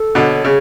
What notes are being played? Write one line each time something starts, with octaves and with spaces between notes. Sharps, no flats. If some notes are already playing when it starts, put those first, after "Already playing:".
Already playing: A4
B2 D3 C#5
C#3 G#4